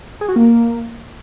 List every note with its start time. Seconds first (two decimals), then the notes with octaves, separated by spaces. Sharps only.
0.21 G#4
0.29 F#4
0.36 A#3